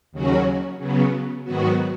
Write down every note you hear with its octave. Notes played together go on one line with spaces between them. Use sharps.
D#2 C#3 F#3 C#4 F#4
C#3 F#3 B3
G#2 D#3 F#3 B3 F#4